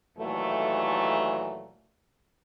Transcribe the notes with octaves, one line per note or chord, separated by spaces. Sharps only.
D#2 A#2 E3 F#3 A3